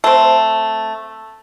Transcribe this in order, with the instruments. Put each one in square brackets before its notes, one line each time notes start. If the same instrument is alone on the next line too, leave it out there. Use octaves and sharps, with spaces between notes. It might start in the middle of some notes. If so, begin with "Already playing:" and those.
[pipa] A3 C4